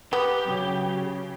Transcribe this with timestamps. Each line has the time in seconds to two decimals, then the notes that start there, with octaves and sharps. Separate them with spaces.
0.13 B3 G4
0.46 C#3 F#3